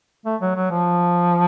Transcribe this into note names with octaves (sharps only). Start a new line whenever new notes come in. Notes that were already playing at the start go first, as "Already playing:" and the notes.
A3
F#3
F#3
F3